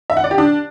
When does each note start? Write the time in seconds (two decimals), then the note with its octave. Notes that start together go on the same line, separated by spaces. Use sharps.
0.10 E5
0.17 F#5
0.24 D5
0.31 G4
0.38 D4